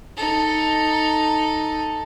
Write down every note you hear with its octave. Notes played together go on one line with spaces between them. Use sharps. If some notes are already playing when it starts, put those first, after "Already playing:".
D#4 A4